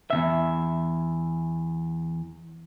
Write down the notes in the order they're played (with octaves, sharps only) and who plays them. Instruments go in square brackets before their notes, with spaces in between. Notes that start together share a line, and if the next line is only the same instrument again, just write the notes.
[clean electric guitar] E2 B2 E5